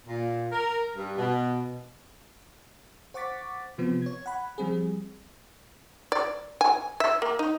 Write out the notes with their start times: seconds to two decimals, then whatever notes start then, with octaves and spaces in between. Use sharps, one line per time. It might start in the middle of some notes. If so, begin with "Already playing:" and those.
0.06 A#2
0.51 A#4
0.96 G2
1.17 B2
3.14 C5 F#5 C#6 D6 A6 B6
3.78 C3 F3 B3 C4
4.02 C#5 G#6
4.26 F#5 B5
4.58 F3 G3 C4 G#4
6.12 D5
6.61 G#5
7.00 E5
7.22 A#3
7.39 D#4